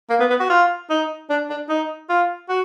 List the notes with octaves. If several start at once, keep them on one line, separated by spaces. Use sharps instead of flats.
A#3
B3
B3
F#4
F4
D#4
D4
D4
D#4
F4
F#4